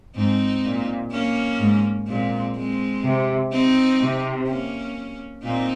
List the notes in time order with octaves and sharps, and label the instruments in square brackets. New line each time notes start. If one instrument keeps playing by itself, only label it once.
[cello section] G#2 [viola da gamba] C4 D#4
[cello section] A#2
[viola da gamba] A#3 C#4
[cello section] G#2
[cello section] A#2 [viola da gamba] G#3 C4
[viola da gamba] G#3 C4
[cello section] C3
[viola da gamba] C4 D#4
[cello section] C3
[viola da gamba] A#3 C#4
[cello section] A#2 [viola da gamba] C4 D#4